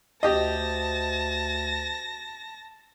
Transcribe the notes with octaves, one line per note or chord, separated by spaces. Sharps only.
D2 G4 D#5 A5 A#6